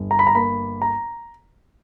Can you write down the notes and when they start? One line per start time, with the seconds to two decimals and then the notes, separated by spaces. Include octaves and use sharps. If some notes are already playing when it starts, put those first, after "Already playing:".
Already playing: G1
0.11 A#5
0.19 B5
0.27 A#5
0.35 A#3 B5
0.82 A#5